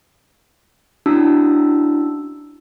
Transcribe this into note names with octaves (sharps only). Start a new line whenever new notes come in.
C#4 D4 E4 F#4 A5 E6